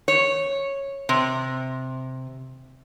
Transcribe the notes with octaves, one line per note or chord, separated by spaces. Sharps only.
C#5
C3